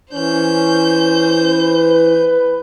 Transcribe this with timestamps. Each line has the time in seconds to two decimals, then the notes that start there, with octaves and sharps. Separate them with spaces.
0.13 E3 C#4 C5 G6
1.51 B4